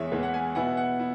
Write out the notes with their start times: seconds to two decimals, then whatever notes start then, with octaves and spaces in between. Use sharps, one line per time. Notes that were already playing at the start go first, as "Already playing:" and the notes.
Already playing: E2 E3 G#3 C#5 E5
0.12 E2 E3 G#3
0.23 F#5
0.34 G#5
0.55 B2 B3 E4 F#5
0.77 F#5
0.99 E4